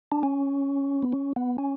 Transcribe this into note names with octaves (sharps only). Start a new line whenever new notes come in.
D4
C#4
B3
C#4
B3
C#4